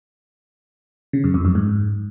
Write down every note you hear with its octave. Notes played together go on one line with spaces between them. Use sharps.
C#3
F#2
F2
F#2
G#2